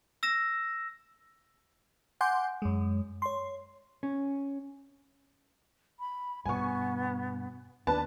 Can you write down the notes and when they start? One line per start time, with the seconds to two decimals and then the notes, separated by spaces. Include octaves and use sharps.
0.23 E6 A#6 E7
2.21 F#5 G#5 C6 D6 G6
2.62 F#2 G#3
3.22 C#5 C6
4.03 C#4
6.00 B5
6.46 G2 B2 B3 G#5 C#6
7.87 D#2 D4 B4 A5